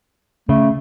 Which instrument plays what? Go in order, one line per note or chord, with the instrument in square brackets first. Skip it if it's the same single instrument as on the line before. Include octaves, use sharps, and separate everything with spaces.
[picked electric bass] C#3 [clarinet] A3